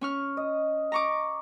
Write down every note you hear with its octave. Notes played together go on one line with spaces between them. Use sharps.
C#4 C#6 F6
D#5
A#5 C#6 D6